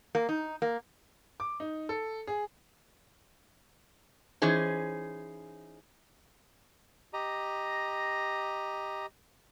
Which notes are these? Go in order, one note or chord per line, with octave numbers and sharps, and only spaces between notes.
A#3
D#4
A#3
D6
D#4
A4
G#4
E3 C#4 D#4 G#4 C5
G4 D#5 A#5